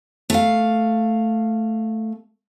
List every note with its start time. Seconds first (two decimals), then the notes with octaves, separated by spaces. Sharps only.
0.30 A3 F5